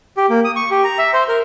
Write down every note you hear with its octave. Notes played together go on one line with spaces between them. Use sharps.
G4
A#3
D#6
C#6
G4
A#5
E5
C5
A#4